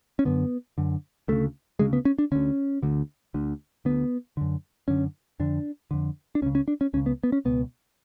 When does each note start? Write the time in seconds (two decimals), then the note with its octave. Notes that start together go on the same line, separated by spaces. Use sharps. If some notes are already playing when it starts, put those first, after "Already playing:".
0.19 C#4
0.25 F#2 D3 B3
0.78 F#2 D3
1.28 D2 C#3 A3
1.79 D2 C#3 G#3
1.93 B3
2.05 C#4
2.19 D4
2.32 D2 D3 C#4
2.82 D2 D3
3.34 D2 D3
3.85 D2 D3 B3
4.37 F#2 D3
4.88 F#2 D3 C#4
5.40 F2 D3 D4
5.91 F2 D3
6.35 D4
6.42 C#2 C#4
6.46 C#3
6.55 C#4
6.68 D4
6.81 C#4
6.94 C#2 C#4
6.97 C#3
7.06 B3
7.24 B3
7.32 C#4
7.45 C#2 B2 B3